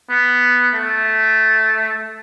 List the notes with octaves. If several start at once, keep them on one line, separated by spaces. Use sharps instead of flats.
B3
A3